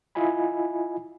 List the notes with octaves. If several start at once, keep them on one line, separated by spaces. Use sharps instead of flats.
E4 F4 D#5 G#5 B5